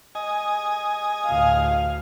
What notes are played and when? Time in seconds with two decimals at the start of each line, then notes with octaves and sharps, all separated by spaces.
0.15 D#5 G#5
1.28 D2 A2 F5